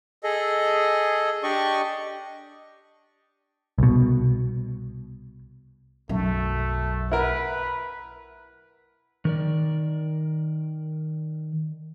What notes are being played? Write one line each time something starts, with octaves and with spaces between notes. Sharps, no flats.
G#4 A4 D#5
D4 G4 D5 D#5 C#6
C2 B2
B1 F#2 A3
E4 A#4 B4 F#5
D#3 A#4 D5